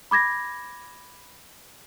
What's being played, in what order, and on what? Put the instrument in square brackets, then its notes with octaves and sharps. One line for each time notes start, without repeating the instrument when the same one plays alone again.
[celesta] B5 D6 G#6 A#6